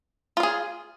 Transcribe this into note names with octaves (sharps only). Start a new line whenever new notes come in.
F4 G#4 F5